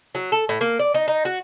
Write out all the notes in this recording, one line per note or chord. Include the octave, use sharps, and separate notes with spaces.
F#3
A4
A2
A#3
D5
D#4
D#4
F#4